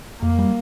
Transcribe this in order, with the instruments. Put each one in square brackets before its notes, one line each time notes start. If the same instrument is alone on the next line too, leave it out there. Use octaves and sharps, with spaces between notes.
[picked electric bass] F2 [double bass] A#3
[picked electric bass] G3